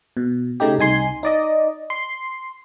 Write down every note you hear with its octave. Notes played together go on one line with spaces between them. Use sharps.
B2
C#3 A3 D#4 G4
C2 D#4 G#5 C6
D#4 D5 D#5
C6